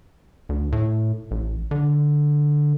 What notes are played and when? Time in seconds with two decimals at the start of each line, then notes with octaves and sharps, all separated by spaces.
0.49 D2
0.72 A2
1.31 A1
1.71 D3